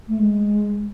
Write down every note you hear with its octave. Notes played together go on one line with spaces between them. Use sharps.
A3
G#3